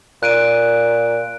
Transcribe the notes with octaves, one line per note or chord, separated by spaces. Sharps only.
A#2 F#6 D7 D#7